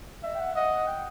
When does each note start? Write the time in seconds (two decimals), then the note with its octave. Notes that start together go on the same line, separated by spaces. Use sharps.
0.24 D#5 E5
0.34 G5
0.39 F#5
0.55 D#5 F#5
0.87 G5